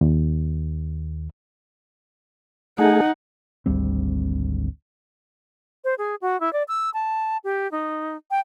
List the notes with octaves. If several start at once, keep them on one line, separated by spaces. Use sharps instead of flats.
D#2
A3 D#4 G#4 F#5
G#1 D2 G3 C4
C5
G#4
F#4
E4
D5
E6
A5
G4
D#4
G5